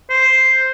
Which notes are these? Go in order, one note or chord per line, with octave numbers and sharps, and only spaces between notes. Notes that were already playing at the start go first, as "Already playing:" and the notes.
C5